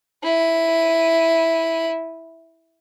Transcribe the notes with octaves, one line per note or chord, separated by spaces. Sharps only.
E4 D#7